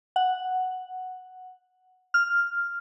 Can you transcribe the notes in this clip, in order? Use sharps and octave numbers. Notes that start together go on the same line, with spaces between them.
F#5
F6